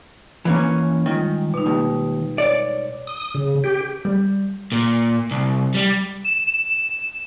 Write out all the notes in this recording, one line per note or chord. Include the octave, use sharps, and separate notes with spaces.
E3 A#3 C#4
D#3 G3 G#3 F4
B2 D#4
D#2
C#5 D5
D#6
C#3
G4
G3
A#2
C2
G3
E7